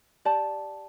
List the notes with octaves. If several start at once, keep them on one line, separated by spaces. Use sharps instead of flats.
G4 D5 A5